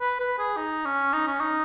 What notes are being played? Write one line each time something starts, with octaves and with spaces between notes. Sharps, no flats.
B4
B4
G#4
D#4
C#4
D#4
C#4
D#4